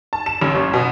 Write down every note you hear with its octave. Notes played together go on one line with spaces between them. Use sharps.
A5
E7
A1
F#1
B2